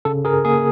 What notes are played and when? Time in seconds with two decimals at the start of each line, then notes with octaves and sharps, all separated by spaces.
0.05 C#3 A4
0.25 G#4 A#4
0.44 A#3 G#4